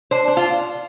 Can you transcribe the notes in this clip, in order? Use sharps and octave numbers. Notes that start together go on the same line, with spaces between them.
D4 C5
D4
F4